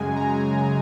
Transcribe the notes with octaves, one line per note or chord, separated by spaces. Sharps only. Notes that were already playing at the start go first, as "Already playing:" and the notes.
Already playing: F#2 C#3 G#3 G#5
A#5